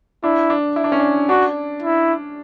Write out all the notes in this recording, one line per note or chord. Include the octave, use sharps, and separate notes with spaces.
D4 E4
D4
E4
D4
C#4
D4
D4 F#4
E4